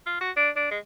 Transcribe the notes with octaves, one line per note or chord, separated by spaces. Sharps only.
F4
F#4
D4
D4
G#3